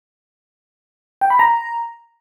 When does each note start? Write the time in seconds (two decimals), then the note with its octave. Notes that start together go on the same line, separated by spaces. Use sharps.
1.21 G5
1.30 B5
1.39 A#5